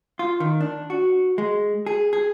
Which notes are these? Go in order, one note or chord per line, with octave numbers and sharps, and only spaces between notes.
F4
D#3
D4
F#4
G#3
G#4
G#4